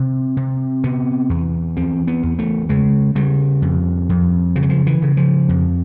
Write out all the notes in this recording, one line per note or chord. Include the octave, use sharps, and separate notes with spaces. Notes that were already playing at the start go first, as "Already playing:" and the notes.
Already playing: C3 C4
C3
C3 B3
E2
E2 C4
B3
E2
A3
C#3 G#3
C#3 G3
F2
F2
C#3 F3
F#3
F3
E3
C#3
F3
F2